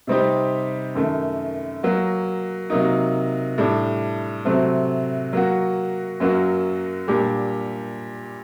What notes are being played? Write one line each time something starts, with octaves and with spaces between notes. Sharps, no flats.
C3 G3 C4 D#4 G4
F#2 D#3 A3
F#3 A#3 F#4
C3 F#3 A#3 D#4
A2 G3 D4
C3 F#3 A3 C4
F#3 A#3 F#4
F#2 F#3 A#3 F#4
A#2 G3 D4 G4